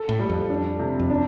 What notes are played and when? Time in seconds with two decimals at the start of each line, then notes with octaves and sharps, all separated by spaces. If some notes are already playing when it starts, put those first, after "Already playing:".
Already playing: A4
0.09 A2
0.19 G3
0.29 F2
0.50 D4
0.79 C3
0.99 F2
1.10 D4